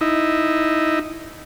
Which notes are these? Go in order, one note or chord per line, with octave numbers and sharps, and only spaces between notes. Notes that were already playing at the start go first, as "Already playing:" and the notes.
D#4 E4